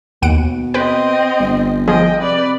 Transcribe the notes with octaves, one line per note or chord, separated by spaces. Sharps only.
D#2 B2 F#5 D7
C4 B4 D#5 G5
G1
F3 G#4 D#5 G5
C3 B4 D5